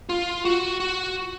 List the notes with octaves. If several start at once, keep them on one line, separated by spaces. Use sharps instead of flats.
F4
F#4
F#4